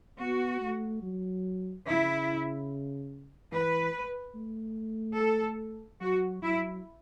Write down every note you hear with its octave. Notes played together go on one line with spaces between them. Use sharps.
B3 F#4
A3
F#3
C#3 E4
E3 B4
A3
A4
F#3 F#4
F#3 E4